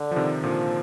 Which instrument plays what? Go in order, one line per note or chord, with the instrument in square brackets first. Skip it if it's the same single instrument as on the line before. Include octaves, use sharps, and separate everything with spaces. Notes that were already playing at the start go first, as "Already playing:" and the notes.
Already playing: [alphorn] D3
[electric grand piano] F3
C3 D#3
[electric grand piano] A#2 D3 [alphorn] F3